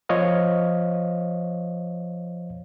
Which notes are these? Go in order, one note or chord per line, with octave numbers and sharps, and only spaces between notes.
F3 C5 C#5 D#5 F5